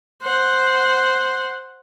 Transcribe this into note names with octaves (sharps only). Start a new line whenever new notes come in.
C5 F#5